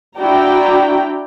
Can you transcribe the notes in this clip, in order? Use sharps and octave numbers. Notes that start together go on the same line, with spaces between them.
D4 E4 F#4 D5 G5 A#5